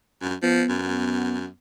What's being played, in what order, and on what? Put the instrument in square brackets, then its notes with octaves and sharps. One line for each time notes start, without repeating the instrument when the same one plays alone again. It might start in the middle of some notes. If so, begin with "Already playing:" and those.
[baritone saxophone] F#2
[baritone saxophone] F3 [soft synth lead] B3
[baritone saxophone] F#2